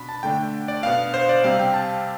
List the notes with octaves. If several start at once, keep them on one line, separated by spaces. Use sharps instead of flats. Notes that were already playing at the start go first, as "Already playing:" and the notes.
Already playing: B2 D4 B5
A5
D3 A3 D4 G5
D5
B2 B3 D4 F5
C5
D5
C3 G3 C4 F5
G5
A5